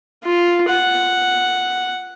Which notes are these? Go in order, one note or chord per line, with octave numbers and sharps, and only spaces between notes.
F4
F#5